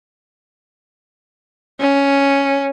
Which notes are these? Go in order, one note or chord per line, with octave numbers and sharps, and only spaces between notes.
C#4